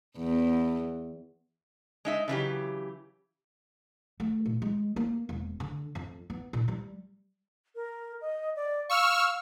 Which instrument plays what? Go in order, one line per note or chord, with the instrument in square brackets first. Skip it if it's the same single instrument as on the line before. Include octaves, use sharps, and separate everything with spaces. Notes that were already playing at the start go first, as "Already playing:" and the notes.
[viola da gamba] E2
[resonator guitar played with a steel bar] G#3 D#4 E5
C#3 E3 F#3 G4
[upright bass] A3
A#2
G#3
A#3
E1
D3
F2
B3
A#2
G3
[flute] A#4
D#5
D5
[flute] F5 [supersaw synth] C#6 E6 F6